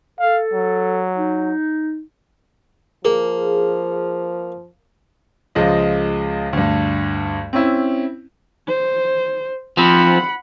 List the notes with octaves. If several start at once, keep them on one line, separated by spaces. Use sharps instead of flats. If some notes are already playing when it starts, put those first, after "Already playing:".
A4 F5
F#3
D#4
F3 A#3 G#4
C#2 F3 G#3 D#5
D2 G2
C4 C#4 E4
C5
F3 C4 F#5 B5